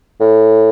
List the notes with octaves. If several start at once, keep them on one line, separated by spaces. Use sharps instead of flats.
A2